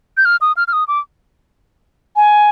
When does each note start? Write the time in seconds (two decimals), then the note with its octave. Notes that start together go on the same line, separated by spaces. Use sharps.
0.17 G6
0.25 F6
0.41 D#6
0.57 F6
0.68 F6
0.73 D#6
0.88 D6
2.16 G#5